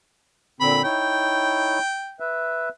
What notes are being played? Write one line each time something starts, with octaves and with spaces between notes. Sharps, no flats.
A#2 D3 C4 B5
D#4 E4 C#5 G5
B4 E5